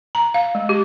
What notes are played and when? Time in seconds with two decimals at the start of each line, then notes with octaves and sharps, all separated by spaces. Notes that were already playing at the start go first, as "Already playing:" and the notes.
0.15 A#5
0.34 F5
0.55 G#3
0.69 G4